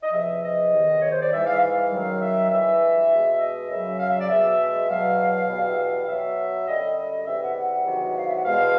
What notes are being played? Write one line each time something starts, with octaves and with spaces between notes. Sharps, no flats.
D#5
E2 C3 F3 E5
D#5
E2 C3 D#3
C#5
C5
D5
G#2 E3 G3 E5
F5
F5
F#2 D#3 F#3
E5
G2 E3 G#3 E5
B2 G#3
D#5
F#2 C#3 F#3 E5
F5
E5
D5
B2 G#3 E5
E2 B2 F#3 F5
E2 B2 G3
E5
F5
B2 F#3 E5
F#2 D3 G3 D#5
D#5
E2 C3 E3 G3 E5
F#5
F#5
E2 C3 D#3 F#3
F5
E5
F#5
E2 B2 G#3 F5